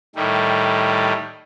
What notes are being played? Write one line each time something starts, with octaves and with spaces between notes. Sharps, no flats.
A2 D#3 G3 A3